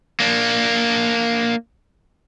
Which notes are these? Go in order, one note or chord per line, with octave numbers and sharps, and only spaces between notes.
A#3 D4